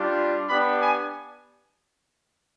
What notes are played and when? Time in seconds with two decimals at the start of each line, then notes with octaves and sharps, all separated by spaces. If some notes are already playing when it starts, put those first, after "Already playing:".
Already playing: G3 D4 F4
0.48 B3 D4 G4 B5
0.80 G#5